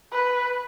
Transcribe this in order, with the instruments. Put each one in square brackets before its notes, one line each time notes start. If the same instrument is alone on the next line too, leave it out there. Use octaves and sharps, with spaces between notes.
[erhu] B4